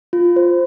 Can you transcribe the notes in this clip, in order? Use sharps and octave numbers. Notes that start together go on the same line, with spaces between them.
F4
C5